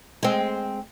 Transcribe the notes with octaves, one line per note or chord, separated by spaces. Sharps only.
G#3 C4